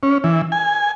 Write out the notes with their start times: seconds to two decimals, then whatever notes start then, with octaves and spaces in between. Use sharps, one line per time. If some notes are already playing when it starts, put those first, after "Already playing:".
0.03 C#4
0.24 E3
0.52 G#5